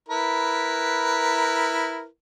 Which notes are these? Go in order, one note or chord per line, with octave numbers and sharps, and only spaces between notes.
E4 A#4 B4